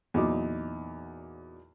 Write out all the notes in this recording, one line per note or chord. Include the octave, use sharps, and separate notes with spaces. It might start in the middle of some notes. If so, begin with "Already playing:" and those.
E2 A#2 F#3 D#4 D6